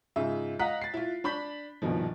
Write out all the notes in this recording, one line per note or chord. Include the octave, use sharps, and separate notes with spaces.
G#2 C#3 F4 E5
D#5 F5 F#5 A#5 F#6 B6
A6 C7
E4 F4
D4 B5 G6 B6
A#1 G2 B2 D#3 F3